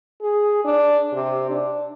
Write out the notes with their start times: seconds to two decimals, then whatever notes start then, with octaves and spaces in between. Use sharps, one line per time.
0.22 G#4
0.64 D4
1.13 C3
1.50 D4